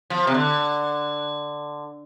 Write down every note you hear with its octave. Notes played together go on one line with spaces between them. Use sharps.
F3
C3
D3